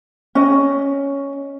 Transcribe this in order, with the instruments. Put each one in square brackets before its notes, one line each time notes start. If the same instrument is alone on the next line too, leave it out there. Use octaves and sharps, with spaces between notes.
[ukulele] C#4 D#5